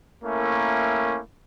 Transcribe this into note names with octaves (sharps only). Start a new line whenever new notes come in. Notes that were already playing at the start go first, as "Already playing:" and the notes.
A3 A#3 C#4 E4 A#4